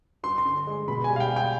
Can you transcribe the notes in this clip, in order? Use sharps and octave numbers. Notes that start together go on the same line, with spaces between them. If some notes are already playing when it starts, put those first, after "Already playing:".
G2 C6
C6
D3
G#3
B2 B5
G#5
G3
F5
G5
G3
G5